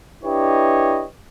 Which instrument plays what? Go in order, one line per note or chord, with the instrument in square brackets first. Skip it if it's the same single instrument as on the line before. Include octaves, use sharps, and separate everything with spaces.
[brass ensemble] D4 E4 G4 B4 C#5 D#5